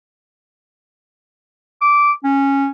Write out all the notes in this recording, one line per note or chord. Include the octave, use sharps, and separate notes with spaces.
D6
C#4